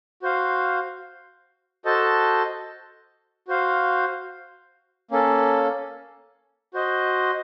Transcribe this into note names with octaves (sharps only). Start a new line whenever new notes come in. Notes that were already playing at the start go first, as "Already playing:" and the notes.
F#4 C5 F5
F#4 A4 C5 D#5 A5
F#4 C5 F5
A#3 C#4 A4
F#4 C5 D#5